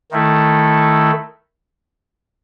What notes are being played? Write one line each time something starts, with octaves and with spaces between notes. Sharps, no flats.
D#3 A3 E4 A4